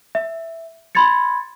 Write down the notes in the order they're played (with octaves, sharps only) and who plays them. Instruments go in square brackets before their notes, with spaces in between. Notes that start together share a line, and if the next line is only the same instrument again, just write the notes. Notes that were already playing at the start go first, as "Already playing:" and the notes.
[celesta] E5
B5 C6 G#6 A6 C#7